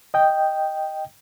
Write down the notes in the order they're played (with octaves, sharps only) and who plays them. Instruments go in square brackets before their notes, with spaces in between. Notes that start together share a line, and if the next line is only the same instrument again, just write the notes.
[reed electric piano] D#5 G5